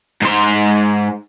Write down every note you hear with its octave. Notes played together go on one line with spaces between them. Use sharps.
G#2 C6